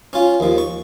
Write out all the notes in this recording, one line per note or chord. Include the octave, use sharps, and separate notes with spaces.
C#4 F4
D#2 F3
C#6